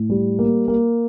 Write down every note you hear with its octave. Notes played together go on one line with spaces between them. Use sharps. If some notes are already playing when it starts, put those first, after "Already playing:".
Already playing: A2
G3
A#3
A#3